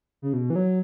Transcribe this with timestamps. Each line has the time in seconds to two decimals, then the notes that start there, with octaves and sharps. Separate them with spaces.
0.22 C#3
0.33 B2
0.50 E3
0.56 F#3